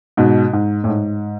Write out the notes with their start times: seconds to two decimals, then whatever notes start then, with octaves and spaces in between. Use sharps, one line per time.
0.17 G#2 B2
0.53 G#2
0.84 A2
0.89 G#2